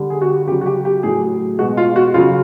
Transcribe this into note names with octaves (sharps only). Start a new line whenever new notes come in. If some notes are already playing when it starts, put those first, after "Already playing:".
Already playing: D3 G3
G#4
F#4
G4
C#3 F#3 G4
F#4
G4
G4
A2 F#3 G#4
B2 G#3 F#4
F4
F#4
C#3 F#3 F4